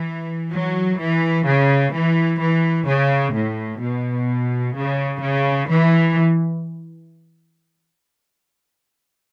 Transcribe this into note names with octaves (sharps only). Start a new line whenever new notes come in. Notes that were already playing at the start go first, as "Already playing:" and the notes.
Already playing: E3
F#3
E3
C#3
E3
E3
C#3
A2
B2
C#3
C#3
E3